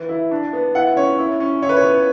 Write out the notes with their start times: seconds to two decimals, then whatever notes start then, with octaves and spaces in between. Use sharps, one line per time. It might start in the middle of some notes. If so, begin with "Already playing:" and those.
Already playing: E3
0.09 E4
0.31 D4
0.53 B3
0.75 E4 F#5
0.97 C#4 C#5
1.19 E4
1.40 C#4
1.62 E4 C#5
1.69 B4
1.76 C#5
1.84 B3